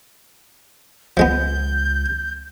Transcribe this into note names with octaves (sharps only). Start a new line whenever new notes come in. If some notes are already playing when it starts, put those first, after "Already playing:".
C#2 F3 G#3 B3 G6